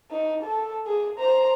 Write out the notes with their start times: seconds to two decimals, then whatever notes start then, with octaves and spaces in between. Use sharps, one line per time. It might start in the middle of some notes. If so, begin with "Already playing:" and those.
0.11 D#4
0.43 A4
0.86 G#4
1.19 C5 A#5